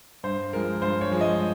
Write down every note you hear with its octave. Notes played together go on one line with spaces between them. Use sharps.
G2 C5
F3 G#3 A#4
G2 C5
C#5
F3 G#3
D#5